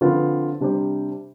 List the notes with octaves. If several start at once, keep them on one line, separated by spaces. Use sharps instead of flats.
D3 F3 C4 F4 B4
C3 G3 D4 G4 C5